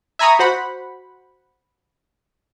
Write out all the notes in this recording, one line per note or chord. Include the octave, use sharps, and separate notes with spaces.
E5 G#5 A#5 B5 C#6 D#6
F#4 C5 F#5 B5